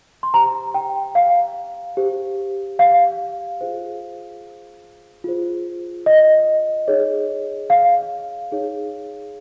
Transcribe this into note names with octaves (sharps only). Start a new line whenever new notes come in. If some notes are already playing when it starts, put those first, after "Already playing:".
C6
G4 C5 A#5
G5
F5
G4 C5
F5
F4 G#4 C5
F4 G#4 C5
D#5
D#4 G#4 C#5
F5
D#4 G#4 C#5